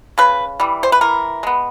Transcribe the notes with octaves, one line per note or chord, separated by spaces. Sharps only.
C#3 B4
E3 G3
C5
B4
E3 A#4
G#3 B3